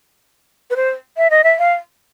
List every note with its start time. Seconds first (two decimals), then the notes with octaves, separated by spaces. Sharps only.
0.70 B4
0.76 C5
1.17 E5
1.30 D#5
1.44 E5
1.59 F5